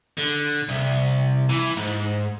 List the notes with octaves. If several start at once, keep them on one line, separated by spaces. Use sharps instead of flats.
D3
C2
E3
G#2